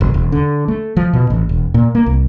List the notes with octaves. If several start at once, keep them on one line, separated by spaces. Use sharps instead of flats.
F#1
E1
D3
A3
F3
B2
A1
E1
A#2
A#3
C2